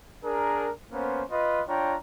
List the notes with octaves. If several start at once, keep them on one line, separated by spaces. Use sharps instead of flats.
D4 G#4 A#4
A#3 B3 C#4 C5
F4 B4 D#5
D4 F4 C#5 G5 A#5